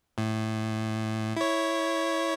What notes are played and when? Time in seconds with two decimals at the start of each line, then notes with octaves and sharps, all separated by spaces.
0.18 A2
1.36 E4 C#5